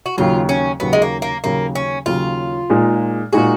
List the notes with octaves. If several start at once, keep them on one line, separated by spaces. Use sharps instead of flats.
F#4
D#2 C#3 F#3 F4
C#4
D#2 C#3 F#3 B3
G#3
A#3
A#3
D#2 C#3 F#3 A#3
C#4
D#2 C#3 F#3 F4
A#2 G#3 D#4 G#4
A#2 G#3 D#4 F#4 G#4